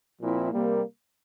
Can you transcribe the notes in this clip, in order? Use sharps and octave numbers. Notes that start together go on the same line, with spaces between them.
A#2 F3 C4 E4
C3 G3 A#3